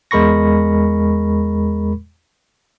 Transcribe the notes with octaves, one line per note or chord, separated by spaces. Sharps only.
E2 G#3 A#4 B5 C#6 A#6